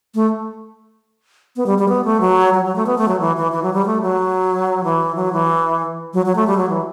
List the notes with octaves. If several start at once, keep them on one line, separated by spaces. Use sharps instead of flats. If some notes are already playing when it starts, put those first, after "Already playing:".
A3
B3
G3
G3
B3
A3
F#3
F#3
F#3
A3
B3
A3
F#3
E3
E3
E3
F#3
G3
A3
F#3
E3
F#3
E3
F#3
F#3
A3
G3
F#3
E3